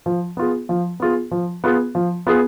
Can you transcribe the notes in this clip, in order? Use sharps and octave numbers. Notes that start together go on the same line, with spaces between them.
F3
B3 F4 G#4
F3
B3 F4 G#4
F3
B3 F4 G#4
F3
B3 F4 G#4